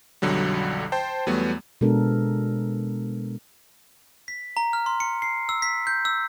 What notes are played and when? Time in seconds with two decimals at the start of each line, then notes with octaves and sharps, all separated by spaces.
0.22 B1 F2 D3 F#3 G3
0.92 C5 G5 A5
1.27 E2 F#3 G3 A3 B3
1.81 B2 G#3 B3 D4 A4 A#4
4.28 B6
4.57 A#5
4.73 F6
4.86 C6
5.00 C#7
5.22 C7
5.49 E6
5.62 B6
5.87 G6
6.05 E6